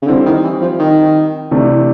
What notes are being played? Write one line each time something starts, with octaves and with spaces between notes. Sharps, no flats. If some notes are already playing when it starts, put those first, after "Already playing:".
C#3
D3 G3 C4 E4
D#3
E3
F3
D#3
C3 E3 A3 D4